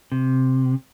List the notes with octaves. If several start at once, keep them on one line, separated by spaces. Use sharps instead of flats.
C3